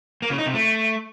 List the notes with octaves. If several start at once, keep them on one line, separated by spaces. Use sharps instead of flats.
A#3
C#3
D#4
C3
A3